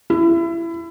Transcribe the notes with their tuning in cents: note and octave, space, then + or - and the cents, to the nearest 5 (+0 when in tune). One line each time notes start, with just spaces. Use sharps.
E4 +25